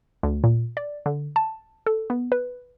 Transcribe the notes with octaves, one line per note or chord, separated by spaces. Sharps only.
D2
A#2
D5
D3
A5
A4
B3
B4